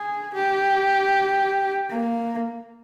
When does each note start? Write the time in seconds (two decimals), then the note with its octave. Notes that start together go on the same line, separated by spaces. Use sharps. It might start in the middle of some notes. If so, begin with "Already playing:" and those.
Already playing: G#4
0.33 G4
1.90 A#3